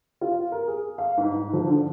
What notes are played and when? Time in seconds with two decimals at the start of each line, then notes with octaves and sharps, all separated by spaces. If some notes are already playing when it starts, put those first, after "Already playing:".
0.21 F4
0.52 A#4
0.67 G#4
0.98 F5
1.17 G#2
1.33 G#2
1.53 F3
1.68 D3